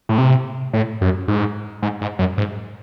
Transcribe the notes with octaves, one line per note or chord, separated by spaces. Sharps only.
A2
C3
A2
F#2
G#2
G#2
G#2
F#2
G#2